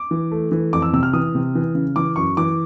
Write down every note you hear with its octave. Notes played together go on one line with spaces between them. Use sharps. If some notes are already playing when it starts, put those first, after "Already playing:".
Already playing: D6
E3
A3
E3
F2 D6
E6
C3 E6
F6
E3 D#6
C3
E3
C#3
E3 D6
F#2 C#6
E3 D6